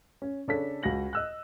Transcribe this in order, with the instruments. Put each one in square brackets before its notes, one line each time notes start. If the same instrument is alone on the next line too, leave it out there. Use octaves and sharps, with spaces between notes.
[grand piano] C#4
C#3 D4 A4 C#5 B6
C#2 F#4 A#6 F#7
D#5 E6 F#6